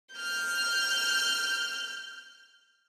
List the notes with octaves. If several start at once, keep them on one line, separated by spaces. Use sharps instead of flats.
F6 G6